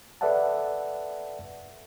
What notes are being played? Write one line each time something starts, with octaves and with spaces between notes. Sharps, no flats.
A4 B4 D5 E5 F#5 A5